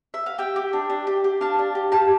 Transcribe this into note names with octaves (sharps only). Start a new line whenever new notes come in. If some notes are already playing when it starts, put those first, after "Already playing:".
E5
F5
G4 E5 G5
G4
D4
D4
G4
G4
D4 F5 A5
D4
G4
G4 F5 A5